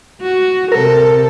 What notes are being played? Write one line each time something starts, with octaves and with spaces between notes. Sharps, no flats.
F#4
C3 A4 A#4